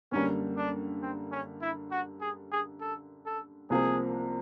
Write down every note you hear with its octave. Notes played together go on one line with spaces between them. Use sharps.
F#2 D3 G3 A#3 C#4
D4
C4
C#4
E4
F#4
G#4
G#4
A4
A4
C2 C3 F3 A#3 G#4